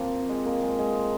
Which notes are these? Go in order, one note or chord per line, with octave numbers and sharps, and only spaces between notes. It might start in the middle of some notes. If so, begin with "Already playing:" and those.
Already playing: F3 A#3 C4
G#3
A#3
G#3
G#3